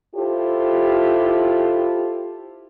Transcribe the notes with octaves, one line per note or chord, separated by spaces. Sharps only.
E4 F4 G4 A4 C5